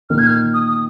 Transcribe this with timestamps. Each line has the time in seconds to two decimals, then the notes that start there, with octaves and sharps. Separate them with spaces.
0.10 A#2 D#3 F6
0.18 G#6
0.27 F6
0.54 D#6
0.68 D#6